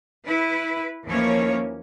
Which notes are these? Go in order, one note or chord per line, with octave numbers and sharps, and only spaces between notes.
E4 B4
D#2 E3 F3 A#3 C#4 C#5